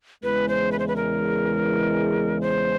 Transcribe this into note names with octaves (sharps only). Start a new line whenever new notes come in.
E2 C#3 E3 G#3 B4
C5
B4
C5
B4
A#4
C5